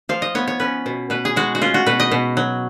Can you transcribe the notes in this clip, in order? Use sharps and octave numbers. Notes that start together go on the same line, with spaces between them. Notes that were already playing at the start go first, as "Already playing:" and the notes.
F3 F5
D#5
B3 C#5
C#5
C#4 B4
B2
B2 B4
G#4
G#3 F#4
F#4
C#4 F4
F#4
B2 B4
D#5
B2
F#3